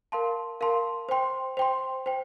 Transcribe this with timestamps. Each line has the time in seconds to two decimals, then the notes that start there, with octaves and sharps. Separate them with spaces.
0.12 A#4 F5 A5 C6
0.61 A#4 F5 A5 C6
1.09 C5 G5 C6
1.57 C5 G5 C6
2.06 C5 G5